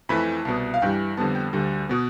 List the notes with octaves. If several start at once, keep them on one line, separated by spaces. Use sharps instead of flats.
F2 E3 A3 B5
C2 B2 B3 A5
F5
G2 E3 G3 G5
F2 D3 G3 B3 A5
G5
D2 D3 G3
B2 B3